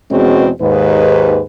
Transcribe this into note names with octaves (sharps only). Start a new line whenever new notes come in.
E2 B2 G#3 C4 C#4 F#4
D#2 G#2 B4